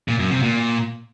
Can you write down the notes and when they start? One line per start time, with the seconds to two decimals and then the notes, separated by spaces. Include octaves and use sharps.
0.08 A#2
0.20 F#2
0.31 C3
0.43 A#2